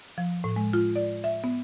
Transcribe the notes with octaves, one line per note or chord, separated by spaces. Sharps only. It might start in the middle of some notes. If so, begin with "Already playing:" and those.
F3
A2
G#3
F4
D5
E5
B3